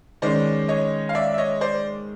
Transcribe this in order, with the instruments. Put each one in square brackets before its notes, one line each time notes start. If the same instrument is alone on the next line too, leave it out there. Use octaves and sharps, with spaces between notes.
[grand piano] D#3 G#3 C#4 C5 D5
C#5 D#5
F5
D5 E5
E5
C#5 D#5
C5 D5